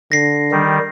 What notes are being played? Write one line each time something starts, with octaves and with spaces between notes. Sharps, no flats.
D3 A#6 C7
D#3 G3